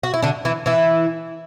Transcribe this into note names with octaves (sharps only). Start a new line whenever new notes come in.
F#4
E4
D3 D4
E3 E4
E3 E4